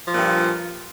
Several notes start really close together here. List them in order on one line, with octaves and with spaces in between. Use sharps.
F3 A#2 G2